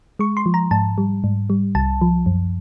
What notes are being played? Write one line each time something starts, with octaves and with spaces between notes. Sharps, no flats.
G#3 C#6
C6
F3
A#5
G#2 A5
G3
G#2
G3
C2 A5
F3
F#2